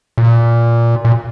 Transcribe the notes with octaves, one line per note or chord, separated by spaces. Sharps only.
A#2
A#2